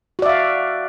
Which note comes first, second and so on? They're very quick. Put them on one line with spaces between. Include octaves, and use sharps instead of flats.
F#4 D5 E5 F5